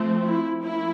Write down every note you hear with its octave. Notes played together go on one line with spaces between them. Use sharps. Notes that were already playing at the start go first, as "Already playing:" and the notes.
Already playing: F3 A3 C4
E4
F3 A#3 C#4 E4